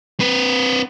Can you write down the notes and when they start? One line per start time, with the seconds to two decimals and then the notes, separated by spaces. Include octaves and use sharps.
0.20 C4 B4